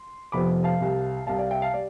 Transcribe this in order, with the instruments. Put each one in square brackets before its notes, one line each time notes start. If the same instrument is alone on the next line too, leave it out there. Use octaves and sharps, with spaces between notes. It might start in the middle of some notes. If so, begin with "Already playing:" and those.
Already playing: [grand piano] C6
F1 F2 C3 F3 B3 B5 D6
F5 A5
C2 C3 G3
C2 C3 G3 F5 A5
D5 F5
E5 G5
F5 A5
G3 D5